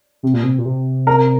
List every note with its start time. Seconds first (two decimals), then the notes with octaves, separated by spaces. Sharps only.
0.23 C3
0.33 A#2
0.43 C3
0.58 A#2
0.65 C3
1.07 A#4